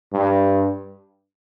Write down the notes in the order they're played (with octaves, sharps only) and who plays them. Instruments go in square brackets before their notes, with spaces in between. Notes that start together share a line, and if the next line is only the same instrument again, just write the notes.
[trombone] G2